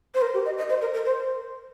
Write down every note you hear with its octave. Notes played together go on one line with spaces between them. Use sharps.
C5
A#4
G4
D#5
D#5
C5
A#4
A#4
C5